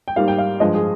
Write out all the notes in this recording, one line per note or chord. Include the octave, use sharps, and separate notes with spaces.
G5
G#2 G3 A#3 F5
G5
F5
G2 F3 G#3 D#5
G#4